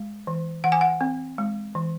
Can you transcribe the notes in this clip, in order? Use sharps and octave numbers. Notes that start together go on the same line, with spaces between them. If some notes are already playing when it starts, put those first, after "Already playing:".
Already playing: G#3
E3
E3 F#5
G#5
F#5
C4
G#3
E3